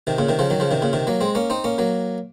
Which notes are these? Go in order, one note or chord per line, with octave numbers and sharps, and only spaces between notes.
C3 D#3
A#2 C#3
C3 D#3
C#3 F3
D#3 F#3
C#3 F3
C3 D#3
A#2 C#3
C3 D#3
F#3 A#3
G#3 C4
A#3 C#4
C4 D#4
A#3 C#4
F#3 A#3